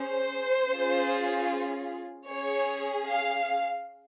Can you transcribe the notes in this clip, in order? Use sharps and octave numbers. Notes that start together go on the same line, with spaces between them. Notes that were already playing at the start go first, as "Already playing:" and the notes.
Already playing: C#4 G#4 C5
C#4 F4 G#4
C#4 G#4 C#5
F5